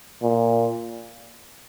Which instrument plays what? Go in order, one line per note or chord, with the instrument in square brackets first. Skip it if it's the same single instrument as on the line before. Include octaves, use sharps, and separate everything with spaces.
[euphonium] A#2